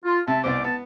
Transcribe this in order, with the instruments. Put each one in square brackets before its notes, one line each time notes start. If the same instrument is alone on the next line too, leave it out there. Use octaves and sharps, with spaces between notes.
[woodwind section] F4
[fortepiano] C3 [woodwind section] E5 A5
[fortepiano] C2 B2 C5 [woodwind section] D5 D6
[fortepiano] B3 [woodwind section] A5